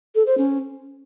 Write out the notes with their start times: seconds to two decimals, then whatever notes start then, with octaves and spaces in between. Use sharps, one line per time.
0.15 A4
0.26 C5
0.38 C#4